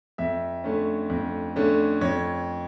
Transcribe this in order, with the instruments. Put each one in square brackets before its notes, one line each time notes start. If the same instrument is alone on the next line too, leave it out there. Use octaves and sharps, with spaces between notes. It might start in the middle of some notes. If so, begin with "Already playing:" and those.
[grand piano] F2 E5
D3 A3 C#4
F2
D3 A3 C#4
F2 C#5